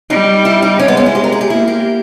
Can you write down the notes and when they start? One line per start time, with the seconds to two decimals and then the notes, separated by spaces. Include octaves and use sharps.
0.10 G3 D#4
0.45 E4
0.62 D#4
0.79 G#3 C#4
0.88 B3
0.97 C#4
1.06 E4
1.15 G4
1.24 A#4
1.32 G#4
1.41 G4
1.50 A#3 E4
1.68 G4